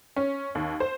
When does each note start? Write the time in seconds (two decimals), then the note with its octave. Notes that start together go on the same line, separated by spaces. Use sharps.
0.16 C#4
0.55 D#2
0.80 C5